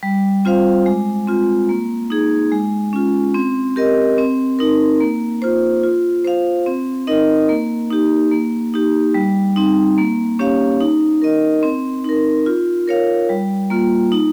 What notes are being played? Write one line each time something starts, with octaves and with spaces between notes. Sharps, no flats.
G3
C4 F4 C5 F5
G#3
C4 F4
A#3
D#4 G#4
G#3
C#4 F4
C4
G4 A#4 D#5
C4
D#4 A#4
A#3
F4 C5
F4
C5 F5
C4
D#4 A#4 D#5
A#3
D#4 G4
A#3
D#4 G4
G3
C4 D#4
A#3
C#4 G4 C#5 F5
D#4
A#4 D#5
C4
D#4 A#4
F4
A#4 C#5 F5
G3
A#3 F4
D#4